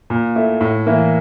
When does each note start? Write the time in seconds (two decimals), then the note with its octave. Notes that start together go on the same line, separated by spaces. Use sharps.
0.10 A#2
0.36 A3 E4
0.61 A2
0.87 E3 A#3 E4